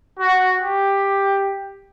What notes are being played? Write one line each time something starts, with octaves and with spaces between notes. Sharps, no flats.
F#4
G4